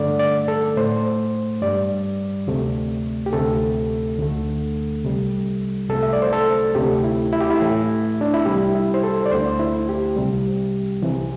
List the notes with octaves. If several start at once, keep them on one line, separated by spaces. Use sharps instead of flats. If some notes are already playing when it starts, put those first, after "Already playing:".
Already playing: G2 D3 A3 D5
D5
A4
A2 A3 C5
G2 G3 D5
D2 C3 A3
G4
D2 C3 A3 A4
D2 D3 A3
C2 C3 G3
C2 C3 A3 A4
E5
D5
C5
A4
D2 C3 A3 G4
E4
E4
G4
E4
A2 E3 A3
D4
E4
C2 C3 G3 G4
E4
C5
A4
D5
D2 D3 A3 C5
E4
G4
C2 C3 G3
C2 C3 E3